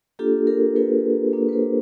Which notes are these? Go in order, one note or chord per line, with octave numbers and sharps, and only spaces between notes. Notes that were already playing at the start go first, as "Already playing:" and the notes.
A#3 D4 F4 G4 A4
G#4 A#4
A#3 D4 F4 A4 B4
A#3 D4 F4
B4
A#4 C5